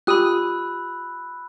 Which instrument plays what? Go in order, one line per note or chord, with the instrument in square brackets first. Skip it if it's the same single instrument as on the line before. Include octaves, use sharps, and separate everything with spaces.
[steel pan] F4 G4 D#6 [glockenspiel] B5 E6 F#6